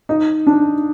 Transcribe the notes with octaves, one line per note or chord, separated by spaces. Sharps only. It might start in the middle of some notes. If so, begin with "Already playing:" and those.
D#4
D4